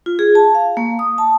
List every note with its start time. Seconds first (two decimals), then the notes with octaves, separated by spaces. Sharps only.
0.06 F4
0.19 G#4
0.35 A5
0.55 F5
0.77 A#3
0.99 D#6
1.18 A5